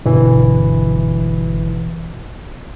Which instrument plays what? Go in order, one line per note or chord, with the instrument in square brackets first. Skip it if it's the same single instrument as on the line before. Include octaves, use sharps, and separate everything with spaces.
[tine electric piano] G1 E3 [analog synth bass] B2